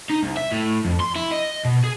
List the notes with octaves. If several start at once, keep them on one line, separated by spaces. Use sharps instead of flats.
D#4
C2
E5
A2
F2
C6
E4
D#5
B2
G#4